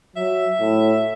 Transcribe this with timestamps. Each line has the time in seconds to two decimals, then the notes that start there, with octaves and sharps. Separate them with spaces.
0.16 F#3 E5
0.61 A2